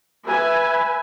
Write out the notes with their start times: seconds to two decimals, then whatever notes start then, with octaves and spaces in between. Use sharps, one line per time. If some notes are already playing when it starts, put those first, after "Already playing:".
0.25 B4 E5 G#5